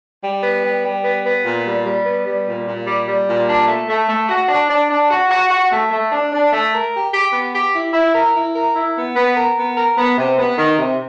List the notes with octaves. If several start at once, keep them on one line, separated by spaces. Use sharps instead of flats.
G3
B3
G3
G3
B3
B3
A#2
G3
G3
B3
G3
A#2
A#2
G3
G3
A#2
D4
A3
A3
A3
F#4
D4
D4
D4
F#4
F#4
F#4
A3
A3
D4
D4
A3
A#4
G4
G4
B3
G4
E4
E4
A#4
E4
A#4
E4
B3
B3
A#4
B3
A#4
B3
C3
B3
D#3
C3